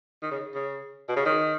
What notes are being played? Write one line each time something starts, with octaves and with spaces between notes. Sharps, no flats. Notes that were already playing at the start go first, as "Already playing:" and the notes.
D#3
C#3
C#3
B2
C#3
D#3